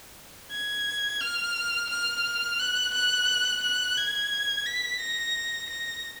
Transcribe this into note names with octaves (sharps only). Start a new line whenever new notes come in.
G#6
F6
F6
F#6
F#6
F#6
G#6
B6
A#6
A#6